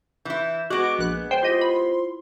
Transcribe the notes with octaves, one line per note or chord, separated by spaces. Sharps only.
E3 E4 G6
G#3 B3 F#4 D6
A#1 B4 F#6
C5 G5 C6
E4 F4 G4 C5 D#5
B5